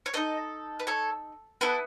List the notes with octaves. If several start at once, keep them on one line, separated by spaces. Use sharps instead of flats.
C#5
D#4 A4 B4 D#5
B4
A4 C#5
B3 E4 A4 B4